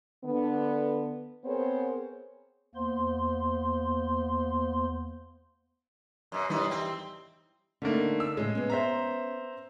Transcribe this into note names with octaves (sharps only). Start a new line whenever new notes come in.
D3 B3
B3 C4 G#4 A#4 C5 C#5
E2 A#3 B3 C5 C6
F#2 B2
F#2 E3 G3 B3 D#4
C4
D3 A3 A#3 C#4 D#4
E6
A2 C#3 G#3
B3 C#4
C5 E5 A#5